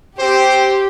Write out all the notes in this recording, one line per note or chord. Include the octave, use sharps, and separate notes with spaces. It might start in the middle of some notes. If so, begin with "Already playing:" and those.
C4 G4 C5